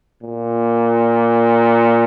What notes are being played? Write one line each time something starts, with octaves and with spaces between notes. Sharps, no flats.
A#2